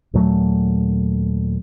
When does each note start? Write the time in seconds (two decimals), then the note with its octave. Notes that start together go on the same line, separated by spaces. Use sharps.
0.14 D#2 A#2 F#3 A3